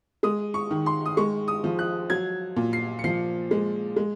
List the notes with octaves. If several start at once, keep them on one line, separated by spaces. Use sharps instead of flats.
G#3 D#6
C#6
D#3
C6
D#6
G#3 C#6
D#6
F3
F#6
F#3 G#6
A#2
C7
C#7
F3 C7
G#3
G#3